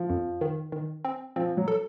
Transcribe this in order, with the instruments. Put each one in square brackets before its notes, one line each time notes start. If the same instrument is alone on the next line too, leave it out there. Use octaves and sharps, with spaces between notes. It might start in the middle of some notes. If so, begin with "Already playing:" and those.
Already playing: [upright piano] F3
[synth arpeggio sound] F2
D#3
D#3
C4
[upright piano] F3 [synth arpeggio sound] C4
[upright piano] F#3
[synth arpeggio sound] A4